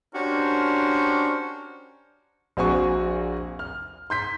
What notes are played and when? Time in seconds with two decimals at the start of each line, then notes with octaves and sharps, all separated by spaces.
0.14 C#4 D4 F#4 G4 A#4 C5
2.57 A#1 C4 F#4 G#5 C#6
3.59 F6
4.10 C6 G6 B6